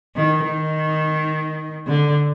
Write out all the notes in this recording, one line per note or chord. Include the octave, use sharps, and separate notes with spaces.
D#3
D#3
D3